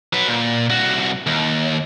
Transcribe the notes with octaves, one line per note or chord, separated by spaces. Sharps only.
F#3 B4
A#2
C2 F#4
D#2